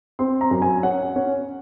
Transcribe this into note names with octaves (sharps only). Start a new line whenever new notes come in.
C4 C6
A#5
F#2
G#5
C#4 F#5
C#4